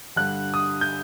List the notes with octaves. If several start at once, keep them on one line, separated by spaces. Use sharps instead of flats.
G2 D3 G3 F#6
D#6
G6